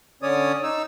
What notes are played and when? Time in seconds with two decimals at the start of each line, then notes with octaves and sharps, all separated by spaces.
0.22 D3 C#4 C#5 D5 D#6
0.63 D#4 E6